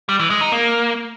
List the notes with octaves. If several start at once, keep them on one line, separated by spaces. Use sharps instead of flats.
G3
E3
G#3
D#4
A#3